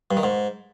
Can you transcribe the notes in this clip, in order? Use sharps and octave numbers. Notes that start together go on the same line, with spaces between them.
G2
D#3
G#2